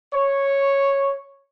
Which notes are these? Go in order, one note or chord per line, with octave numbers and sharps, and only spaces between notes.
C#5